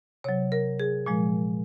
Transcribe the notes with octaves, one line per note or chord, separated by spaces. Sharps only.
C3 F#3 C#5
A#4
G#4
A#2 F3 G#3